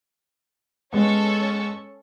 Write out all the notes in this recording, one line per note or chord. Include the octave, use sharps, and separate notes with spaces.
G#3 B3 C#4 A4 C#6